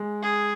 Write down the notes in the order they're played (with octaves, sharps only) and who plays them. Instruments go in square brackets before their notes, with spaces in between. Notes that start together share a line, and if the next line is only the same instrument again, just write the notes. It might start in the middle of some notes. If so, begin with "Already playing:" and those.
Already playing: [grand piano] G#3
[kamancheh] G#4